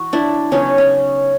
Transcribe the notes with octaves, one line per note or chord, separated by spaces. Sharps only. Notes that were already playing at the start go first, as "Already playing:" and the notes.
Already playing: E3 F#4
D4 E4
C#3 F#3 B3 C#4 D#4
C#4